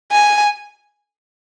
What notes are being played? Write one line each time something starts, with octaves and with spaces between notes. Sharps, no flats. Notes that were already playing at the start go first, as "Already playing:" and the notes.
G#5